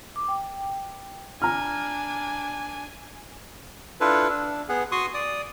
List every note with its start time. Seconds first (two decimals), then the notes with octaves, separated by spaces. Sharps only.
0.16 D6
0.28 G5
1.42 D4 G#5 A#5 F6
4.01 D4 E4 F4 A4 B4
4.29 D4
4.69 B3 G#4 F#5
4.92 F#4 C6 C#6 D#6
5.14 D5 D#6